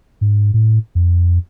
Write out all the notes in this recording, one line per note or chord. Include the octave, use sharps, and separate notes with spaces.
G#2
A2
F2